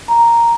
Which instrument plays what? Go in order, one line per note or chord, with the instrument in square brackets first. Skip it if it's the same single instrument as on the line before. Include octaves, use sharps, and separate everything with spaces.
[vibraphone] A#5